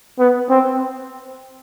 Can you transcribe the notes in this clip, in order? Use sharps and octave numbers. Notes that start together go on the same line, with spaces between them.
B3
C4